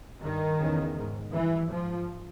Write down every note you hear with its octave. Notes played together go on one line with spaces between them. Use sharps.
G2 D#3
E2 C#3
G#2
G2 E3
G#2 F3